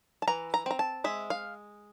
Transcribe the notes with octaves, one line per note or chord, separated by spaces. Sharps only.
A5
E3 A#5
A#5
C4 A#5
A5
G#3 E5
F5